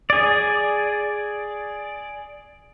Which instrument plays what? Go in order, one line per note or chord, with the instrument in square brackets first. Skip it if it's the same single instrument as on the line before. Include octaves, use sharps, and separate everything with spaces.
[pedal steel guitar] G#4 D5